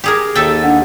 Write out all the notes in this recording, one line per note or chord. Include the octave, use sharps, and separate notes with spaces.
G4 G#4 A#4
D#2 A4 E5 G5 A6
D4 F#5